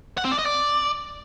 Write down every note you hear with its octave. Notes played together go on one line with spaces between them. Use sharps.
F#5
C4
D5
D#5
D5